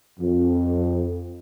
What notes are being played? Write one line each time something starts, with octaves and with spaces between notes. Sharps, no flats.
F2